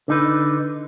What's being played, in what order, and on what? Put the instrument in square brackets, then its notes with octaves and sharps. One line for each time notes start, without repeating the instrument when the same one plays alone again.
[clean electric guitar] D3 D#4 B4